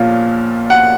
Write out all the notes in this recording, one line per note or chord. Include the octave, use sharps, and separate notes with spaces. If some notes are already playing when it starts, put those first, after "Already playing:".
Already playing: A#1 A#2 F3 A#3 C#4 F5
F#5